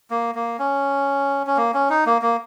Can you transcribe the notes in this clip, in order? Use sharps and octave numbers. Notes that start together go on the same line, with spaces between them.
A#3
A#3
C#4
C#4
A#3
C#4
D#4
A#3
A#3